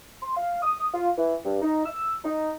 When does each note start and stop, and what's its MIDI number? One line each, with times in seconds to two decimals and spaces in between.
0.22 0.33 84
0.36 0.61 77
0.62 0.87 87
0.94 1.09 65
1.18 1.35 52
1.45 1.61 43
1.62 1.84 63
1.86 2.12 88
2.24 2.52 63